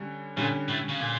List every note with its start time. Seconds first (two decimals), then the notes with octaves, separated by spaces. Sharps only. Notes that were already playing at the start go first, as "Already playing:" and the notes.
Already playing: D3 G3 C#4
0.37 A#2 D3 G3 C#4
0.68 A2
0.89 C#3
1.00 A#2